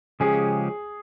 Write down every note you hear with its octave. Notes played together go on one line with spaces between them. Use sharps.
C#3 F3 G#3 C#4 G4 G#4